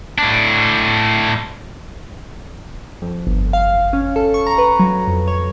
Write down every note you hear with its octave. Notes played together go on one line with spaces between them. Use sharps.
A2 D4
F2
G1
F5
C#4
A4
C#6
A#5
B4
F#3
F2
C#5